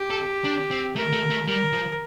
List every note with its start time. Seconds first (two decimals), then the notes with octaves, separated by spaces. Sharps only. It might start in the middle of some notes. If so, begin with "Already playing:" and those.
Already playing: G4
0.11 A4
0.45 D4
0.71 C4
0.96 A3 A#4
1.12 A3
1.30 A3
1.47 G3 A#4
1.72 F3